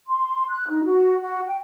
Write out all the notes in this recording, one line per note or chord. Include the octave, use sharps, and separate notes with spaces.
C6
F#6
D#4
F#4
F#4
G5